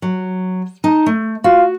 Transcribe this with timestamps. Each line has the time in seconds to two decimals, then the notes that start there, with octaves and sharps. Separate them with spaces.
0.02 F#3
0.84 D#4 A5
1.06 A3
1.44 F4 F#4